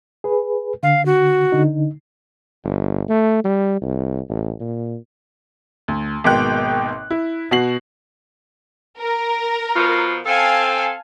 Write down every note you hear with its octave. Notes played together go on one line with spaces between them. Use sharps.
G#4 B4
D3 F5
F#4
D3 D#4
G1
A3
G3
C2
A1
A#2
D2
G#1 G#2 B2 A#3 G5 F#6
E4
B2 F#4 C7 F#7
A#4
B2 F3 F4
C4 A4 F5 G#5 A5